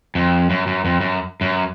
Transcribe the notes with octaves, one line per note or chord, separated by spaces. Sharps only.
F2
F#2
F#2
F2
F#2
F#2